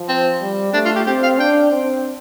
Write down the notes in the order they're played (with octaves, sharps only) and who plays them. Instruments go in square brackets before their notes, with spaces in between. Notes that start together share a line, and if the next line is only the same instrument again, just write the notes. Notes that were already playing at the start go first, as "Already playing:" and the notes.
Already playing: [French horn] F3
[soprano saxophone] C4
[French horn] G3
[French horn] A3 [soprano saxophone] D4
[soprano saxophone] F4
G4
[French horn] C4 [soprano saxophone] G4
[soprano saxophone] F5
[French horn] D4 [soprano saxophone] G5
[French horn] C4